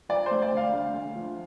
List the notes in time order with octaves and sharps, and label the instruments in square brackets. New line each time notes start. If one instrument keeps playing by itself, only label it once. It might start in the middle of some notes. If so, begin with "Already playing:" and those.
[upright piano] F3 D5
C5
A3
D5
D2 F5
D2
D2
F3